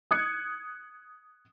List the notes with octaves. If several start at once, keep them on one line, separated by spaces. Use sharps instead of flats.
D#6 F#6 G#6 C#7